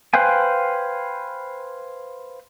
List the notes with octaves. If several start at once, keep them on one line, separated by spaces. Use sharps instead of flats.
B4 C5 F5 G5 G#5